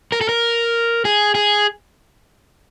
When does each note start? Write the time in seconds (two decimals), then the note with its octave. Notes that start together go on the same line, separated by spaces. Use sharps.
0.12 A#4
0.21 A4
0.29 A#4
1.05 G#4
1.35 G#4